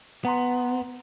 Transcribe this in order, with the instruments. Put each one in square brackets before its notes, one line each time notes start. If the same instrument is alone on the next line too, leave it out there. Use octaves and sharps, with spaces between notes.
[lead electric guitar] B3 [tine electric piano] F#5 A#5 C6